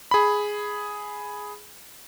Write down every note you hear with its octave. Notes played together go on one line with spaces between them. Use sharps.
G#4 B5